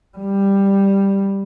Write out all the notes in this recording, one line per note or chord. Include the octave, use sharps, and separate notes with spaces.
G3